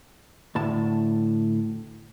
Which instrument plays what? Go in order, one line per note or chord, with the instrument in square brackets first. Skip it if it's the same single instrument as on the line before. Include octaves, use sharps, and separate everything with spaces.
[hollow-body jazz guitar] D2 A2 A5